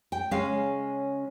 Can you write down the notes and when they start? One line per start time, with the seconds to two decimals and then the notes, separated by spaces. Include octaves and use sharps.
0.12 G5
0.31 C#3 G#3 C#4 F5